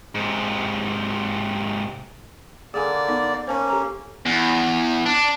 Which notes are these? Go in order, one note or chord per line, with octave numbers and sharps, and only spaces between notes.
G#2 C3
D3 A#3 G#4 A4 D5 G#5
B3 D#4
D5
A#3 C#4 C5 A5 C#6
G4 A4 A#5
E2
D4